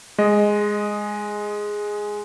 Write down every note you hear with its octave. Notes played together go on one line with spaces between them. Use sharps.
G#3 D#5